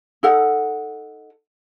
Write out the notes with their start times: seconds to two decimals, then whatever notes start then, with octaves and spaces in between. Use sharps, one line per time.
0.23 D#4 A4 F#5